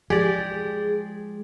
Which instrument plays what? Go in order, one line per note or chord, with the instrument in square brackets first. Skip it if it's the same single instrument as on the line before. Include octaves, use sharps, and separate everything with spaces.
[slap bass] F3 G#3 [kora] G4 D5 [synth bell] G#4